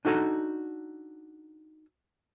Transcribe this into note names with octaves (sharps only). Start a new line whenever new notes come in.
D4 D#4 F#4 A4 G#5 A#5